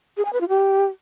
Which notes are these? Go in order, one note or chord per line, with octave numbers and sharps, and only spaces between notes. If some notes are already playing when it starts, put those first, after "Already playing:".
G#4
G#5
B4
F4
G4